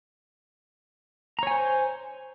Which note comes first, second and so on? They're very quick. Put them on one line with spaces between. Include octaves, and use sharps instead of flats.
A#5 C#5 G#5 C5